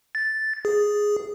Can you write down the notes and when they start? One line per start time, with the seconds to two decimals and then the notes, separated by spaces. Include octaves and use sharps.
0.15 A6
0.65 G#4